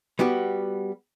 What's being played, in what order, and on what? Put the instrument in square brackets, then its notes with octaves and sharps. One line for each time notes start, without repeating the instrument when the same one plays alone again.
[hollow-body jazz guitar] G3 B3 F#4 G4